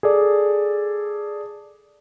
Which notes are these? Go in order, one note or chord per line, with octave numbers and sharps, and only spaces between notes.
G#4 A4 D5